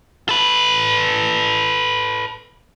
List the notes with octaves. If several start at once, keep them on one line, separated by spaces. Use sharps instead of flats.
A4 B4